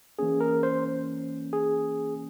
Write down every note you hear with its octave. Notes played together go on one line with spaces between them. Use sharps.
E3 A#3 C#4 G#4
A#4
C5
G#4